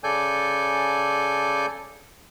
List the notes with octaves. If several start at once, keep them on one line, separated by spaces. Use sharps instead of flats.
C#3 A4 D5 G#5 G6